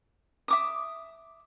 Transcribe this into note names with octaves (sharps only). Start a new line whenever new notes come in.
E5 D6 D#6